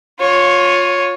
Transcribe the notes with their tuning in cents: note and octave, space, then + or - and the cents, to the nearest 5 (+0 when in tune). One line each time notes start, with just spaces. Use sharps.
F4 +25 C#5 +0